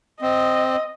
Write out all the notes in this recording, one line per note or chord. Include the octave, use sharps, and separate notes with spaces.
C4 D#5